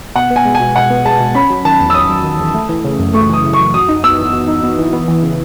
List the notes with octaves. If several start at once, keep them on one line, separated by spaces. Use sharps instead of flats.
B2 F#5
B3
G#5
G#3
G#5
B2
B2 F#5
B3
G#3 A5
B2
C#4 B5
F#3
D#3 A5
E2
E6
C#4 D#6
F#3
D#3
E2
A3
E3
C#3
F#2
A3 C#6
E3 D#6
C#3
C#6
F#2
F#4 D#6
D#4
B3 E6
E3
F#4
D#4
B3
E3
B3
E3
C#3